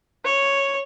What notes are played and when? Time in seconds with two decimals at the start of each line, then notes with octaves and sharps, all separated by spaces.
0.25 C#5